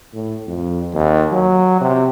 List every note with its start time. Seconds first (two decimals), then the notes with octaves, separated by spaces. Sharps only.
0.14 A2
0.47 F2
0.94 D#2
1.32 F#3
1.81 C3